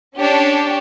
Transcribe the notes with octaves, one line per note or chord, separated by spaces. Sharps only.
C#4 D4 G4 C#5